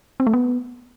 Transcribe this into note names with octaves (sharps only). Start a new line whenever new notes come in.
C4
A3
B3